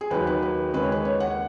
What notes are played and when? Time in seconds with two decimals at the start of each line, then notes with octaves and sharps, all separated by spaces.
0.01 G#4
0.11 D#2 D#3 F#3 B4
0.27 B4
0.42 B4
0.73 D#2 C#3 G#3 B4
0.83 C#5
0.92 B4
1.05 C#5
1.20 F#5